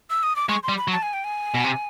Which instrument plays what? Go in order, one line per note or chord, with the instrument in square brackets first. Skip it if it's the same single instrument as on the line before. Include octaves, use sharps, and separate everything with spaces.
[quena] E6
D#6
D6
[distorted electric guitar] G#3 [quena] C#6
[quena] C6
[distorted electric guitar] G3
[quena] B5
[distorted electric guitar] F#3
[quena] A5
G#5
G5
G#5
[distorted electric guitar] B2
C3